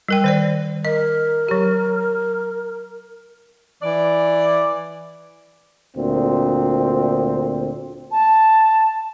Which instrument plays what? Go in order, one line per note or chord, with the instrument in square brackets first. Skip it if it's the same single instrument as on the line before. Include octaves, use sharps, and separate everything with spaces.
[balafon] G3 A#4 G5
D#3 C5 D5
[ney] A#4 [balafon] D#5
[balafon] F#3 G4
[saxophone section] E3 D5
[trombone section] D2 A#2 C4
[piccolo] A5